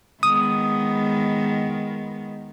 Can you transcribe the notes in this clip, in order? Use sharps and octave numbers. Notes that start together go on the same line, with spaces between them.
D#3 G#3 B3 D#6